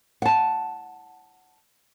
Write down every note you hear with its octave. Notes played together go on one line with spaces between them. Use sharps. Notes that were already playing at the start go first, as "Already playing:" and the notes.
F#5 A5